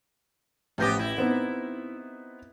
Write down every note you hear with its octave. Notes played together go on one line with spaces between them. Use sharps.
A1 F3 B3 G4 G6 A#6
E4
B3 C4 D#4